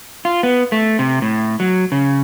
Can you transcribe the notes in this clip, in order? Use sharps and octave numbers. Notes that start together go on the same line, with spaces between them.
F4
B3
A3
C3
A2
F#3
C#3